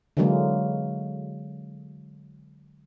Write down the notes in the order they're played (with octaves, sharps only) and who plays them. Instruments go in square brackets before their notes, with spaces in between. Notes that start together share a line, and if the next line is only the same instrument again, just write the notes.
[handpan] D3 E3 F#3 G#3 A#3